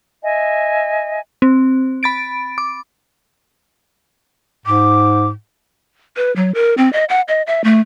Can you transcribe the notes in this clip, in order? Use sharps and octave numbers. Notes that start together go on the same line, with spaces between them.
D#5 E5 G#5
C4
B5 A6 D7
D6
G#2 D6
B4
F#3
A#4
C4
D#5
F#5
D#5
E5
A3